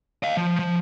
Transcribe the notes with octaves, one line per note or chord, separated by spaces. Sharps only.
D#5 F5
F3
F3